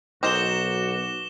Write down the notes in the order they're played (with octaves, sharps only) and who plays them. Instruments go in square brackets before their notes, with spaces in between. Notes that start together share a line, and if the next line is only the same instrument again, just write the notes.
[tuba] B1 [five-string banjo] D#4 A#4 C5 [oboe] F#4 [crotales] D6 E7 G7